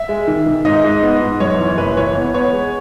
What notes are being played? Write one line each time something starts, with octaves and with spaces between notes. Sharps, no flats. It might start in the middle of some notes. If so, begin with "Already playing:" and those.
Already playing: E5
G#3
D#3
D#3
G#2 D#5
G#2
B3
G#2
F#2 C#5
E3
F#1 B4
E3 C#5
B3 C#5
B3 C#5
G#3